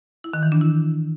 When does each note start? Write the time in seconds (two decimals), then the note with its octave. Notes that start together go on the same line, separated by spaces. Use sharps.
0.24 E4
0.33 D#3
0.43 E3
0.52 D4
0.61 E4